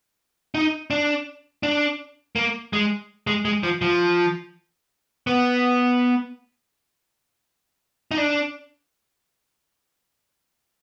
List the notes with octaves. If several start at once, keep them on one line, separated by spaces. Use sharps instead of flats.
D#4
D4
D4
A#3
G#3
G#3
G#3
F3
F3
B3
D#4
D4